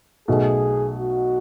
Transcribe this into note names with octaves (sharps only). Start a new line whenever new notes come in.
B1 B2 A3 G#4
F#4